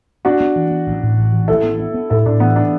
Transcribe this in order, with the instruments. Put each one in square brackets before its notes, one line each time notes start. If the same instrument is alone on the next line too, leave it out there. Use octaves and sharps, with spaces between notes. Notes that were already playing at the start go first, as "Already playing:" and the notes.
[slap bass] B3 [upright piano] D4 F#4
[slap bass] B3
E3
B3
A1
A2
A1
E3
[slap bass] A1 [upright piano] E4 A4
[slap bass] B3
B3
B3
[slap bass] A2 [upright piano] E4 A4
[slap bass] A2 [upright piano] D4
[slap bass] E3 [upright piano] B3
[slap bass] B3 [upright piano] D4